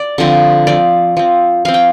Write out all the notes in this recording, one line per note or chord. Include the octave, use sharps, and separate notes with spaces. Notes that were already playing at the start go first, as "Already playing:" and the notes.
Already playing: D5
D3 F3 C4
F3 C4 D5
F3 C4
F3 C4 F5
G5